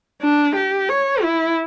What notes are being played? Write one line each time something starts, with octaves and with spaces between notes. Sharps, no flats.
D4
G4
C#5
E4